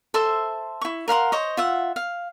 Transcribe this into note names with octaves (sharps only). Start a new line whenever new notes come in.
A4 C5 E5 C6
E4 C#6
A#4 F5 F#5 C6
C5 C#5 D#5
F4 E5 F#5
F5